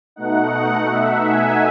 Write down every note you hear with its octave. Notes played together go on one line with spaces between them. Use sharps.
B2 A3 D#4 F#5
E5
G#5